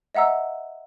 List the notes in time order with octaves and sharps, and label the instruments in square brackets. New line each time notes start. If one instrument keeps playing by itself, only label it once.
[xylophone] D#5 E5 F#5 A#5 E6